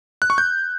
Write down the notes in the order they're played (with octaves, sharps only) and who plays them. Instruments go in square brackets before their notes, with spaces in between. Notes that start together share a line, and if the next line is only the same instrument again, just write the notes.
[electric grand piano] F#6
C#6
G6